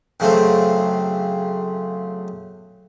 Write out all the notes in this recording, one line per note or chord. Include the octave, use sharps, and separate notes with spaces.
F#2 C#3 A3 C4